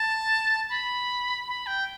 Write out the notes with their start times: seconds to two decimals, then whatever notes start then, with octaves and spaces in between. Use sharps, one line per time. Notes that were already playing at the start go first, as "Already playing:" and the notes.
Already playing: A5
0.70 B5
1.48 B5
1.67 G5